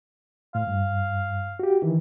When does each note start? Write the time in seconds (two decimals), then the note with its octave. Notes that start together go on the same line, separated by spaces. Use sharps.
0.55 A2 F5
0.67 G2
1.59 F#4 G4
1.82 D#3 E3